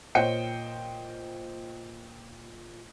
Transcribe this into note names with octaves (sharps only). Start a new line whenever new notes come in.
A#2 C5 C#5 D#5 G5 C#7